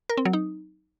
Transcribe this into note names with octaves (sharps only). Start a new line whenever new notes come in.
A#4
C4
F#3
D#4